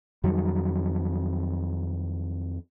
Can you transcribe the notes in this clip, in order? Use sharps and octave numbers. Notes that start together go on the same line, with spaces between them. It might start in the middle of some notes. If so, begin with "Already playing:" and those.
F2 D#3 F#3 G3